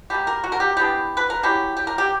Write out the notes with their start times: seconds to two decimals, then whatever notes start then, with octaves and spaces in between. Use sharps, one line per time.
0.10 B2 G3 A#3 G4
0.27 A#4
0.44 F#4
0.52 A#4
0.60 G4
0.77 E3 G3 B3 D4 G4
1.17 B4
1.30 A#4
1.43 F#3 C#4 E4 G4
1.77 G4
1.87 A#4
1.98 G4